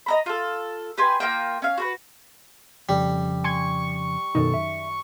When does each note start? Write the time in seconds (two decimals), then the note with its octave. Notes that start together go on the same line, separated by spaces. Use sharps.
0.06 D#5 A#5 B5
0.26 F4 A4
0.97 G4 B4 G#5 C6
1.20 A#3 F4 A#4 G5
1.62 C#4 F5
1.78 F#4 A#4 B4
2.89 F2 C#3 G3
3.44 G#5 C6 C#6 G#6
4.35 F#2 B2 D#3 D#4 A4
4.54 E5